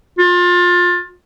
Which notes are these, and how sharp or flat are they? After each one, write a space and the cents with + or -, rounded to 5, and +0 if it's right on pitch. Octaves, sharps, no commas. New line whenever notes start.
F4 +25